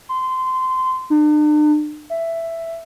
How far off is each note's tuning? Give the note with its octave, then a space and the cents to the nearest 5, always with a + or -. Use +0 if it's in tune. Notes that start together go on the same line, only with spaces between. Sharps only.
C6 -20
D4 +45
E5 +10